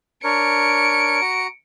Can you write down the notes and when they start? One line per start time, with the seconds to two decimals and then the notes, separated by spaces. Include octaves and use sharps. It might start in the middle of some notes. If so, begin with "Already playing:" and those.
0.24 D4 A#4 C#5 C#7 D7
1.21 F#4 A#5